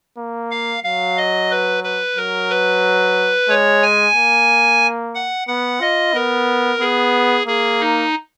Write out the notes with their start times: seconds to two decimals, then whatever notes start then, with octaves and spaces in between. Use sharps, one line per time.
0.18 A#3
0.51 F5
0.83 F#3 F5
1.17 D#5
1.51 B4
1.83 B4
2.16 F#3 A#4
2.50 B4
3.49 G#3 C#5
3.83 G#5
4.15 A#3
5.15 F#5
5.48 B3 F#5
5.81 F4 D#5
6.14 B3 A#4
6.80 B3 G#4
7.47 A#3 G#4
7.80 D#4